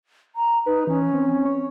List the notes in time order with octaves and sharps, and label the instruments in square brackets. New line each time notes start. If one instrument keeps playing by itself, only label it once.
[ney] A#5
[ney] D#4 [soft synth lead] B4
[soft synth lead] E3 [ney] C#4
[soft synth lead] C4
C#5